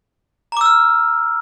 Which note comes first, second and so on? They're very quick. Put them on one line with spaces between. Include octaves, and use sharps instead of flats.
A#5 D6 E6 F6